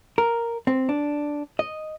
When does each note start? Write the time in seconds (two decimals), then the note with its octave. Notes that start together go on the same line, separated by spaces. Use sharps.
0.18 A#4
0.67 C4
0.89 D4
1.59 D#5